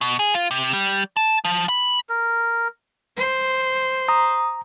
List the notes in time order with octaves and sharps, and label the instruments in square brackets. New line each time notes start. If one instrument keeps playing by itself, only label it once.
[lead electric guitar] B2
G#4
F4
C3
G3
A5
F3
B5
[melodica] A#4
[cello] C5
[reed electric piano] A#5 [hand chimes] D#6